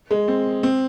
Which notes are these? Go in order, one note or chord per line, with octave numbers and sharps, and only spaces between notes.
G#3
C4
C4